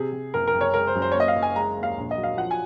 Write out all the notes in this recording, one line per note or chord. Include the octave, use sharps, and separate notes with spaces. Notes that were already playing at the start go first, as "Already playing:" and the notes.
Already playing: C3 G#4
C3
F#1 A#4
A#4
F#1
C#5
G#3 A#4
C5
F#2
C5
A#3 C#5
D#5
F5
F#1
G#5
G#3 A#5
D#2
F5
A#1
D#5
F#3
F5
F3 F#5
G#5